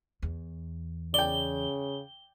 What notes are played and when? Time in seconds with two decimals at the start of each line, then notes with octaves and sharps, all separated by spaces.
0.22 E2
1.14 C#3 D5 G5 G7